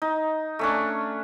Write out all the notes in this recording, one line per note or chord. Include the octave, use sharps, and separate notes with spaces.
D#4
A3 C#4 D4